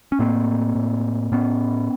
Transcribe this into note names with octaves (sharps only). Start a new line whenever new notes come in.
C#4
A2 A#3 C4
A2
A2 B3 C#4